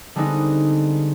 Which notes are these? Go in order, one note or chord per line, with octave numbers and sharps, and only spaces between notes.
D3 G3 G#3 B3 C4 D#4